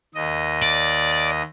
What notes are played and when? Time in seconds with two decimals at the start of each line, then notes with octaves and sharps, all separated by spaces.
0.15 D#2 D#5
0.62 D5